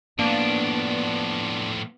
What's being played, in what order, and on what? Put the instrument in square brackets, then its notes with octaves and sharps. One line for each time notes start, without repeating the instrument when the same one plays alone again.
[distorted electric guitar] A2 F3 [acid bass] A#3 [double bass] B3 [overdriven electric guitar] D4